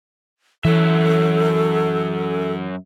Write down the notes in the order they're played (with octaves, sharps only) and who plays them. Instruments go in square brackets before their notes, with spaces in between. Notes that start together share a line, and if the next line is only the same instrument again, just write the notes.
[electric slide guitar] F#2 F#3 E5 [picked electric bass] E3 [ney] A4